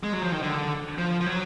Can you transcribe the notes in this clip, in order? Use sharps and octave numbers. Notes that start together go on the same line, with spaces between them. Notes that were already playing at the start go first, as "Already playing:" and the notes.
G#3
F#3
F3
D#3
D3
F3
F3
F#3